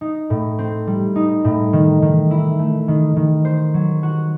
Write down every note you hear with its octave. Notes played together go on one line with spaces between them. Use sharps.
D#4
A2
C4
G3
D#4
A2
D#3
D#3
E4
A3
D#3
D#3
C5
F#3
F#4